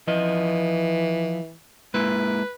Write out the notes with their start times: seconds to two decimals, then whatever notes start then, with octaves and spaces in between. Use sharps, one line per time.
0.08 E3 F3 D#5
1.94 G#3 A#3 E4 B4